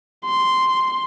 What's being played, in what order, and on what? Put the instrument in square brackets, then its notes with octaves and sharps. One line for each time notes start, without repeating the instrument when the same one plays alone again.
[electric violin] C6